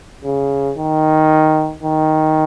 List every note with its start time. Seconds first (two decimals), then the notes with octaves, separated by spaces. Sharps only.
0.24 C#3
0.78 D#3
1.83 D#3